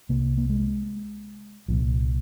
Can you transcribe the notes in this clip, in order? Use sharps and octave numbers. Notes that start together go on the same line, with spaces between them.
C2 C3 A#3
A#3
G#3
C2 A#2 F3